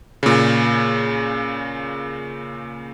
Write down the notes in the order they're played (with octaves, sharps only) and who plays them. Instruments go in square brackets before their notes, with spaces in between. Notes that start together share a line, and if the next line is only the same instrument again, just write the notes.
[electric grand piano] A#2 C#3